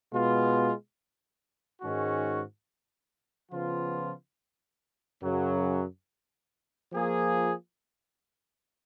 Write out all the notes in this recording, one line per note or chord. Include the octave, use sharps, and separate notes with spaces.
B2 G#3 B3 F4
G#2 D#3 G#3 C#4 F#4
C#3 F3 B3 F4
F#2 C#3 F#3
F3 A#3 F4 G#4